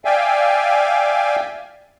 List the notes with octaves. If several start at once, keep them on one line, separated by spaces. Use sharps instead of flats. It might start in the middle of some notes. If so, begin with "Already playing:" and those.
D5 E5 F5 G5 G#5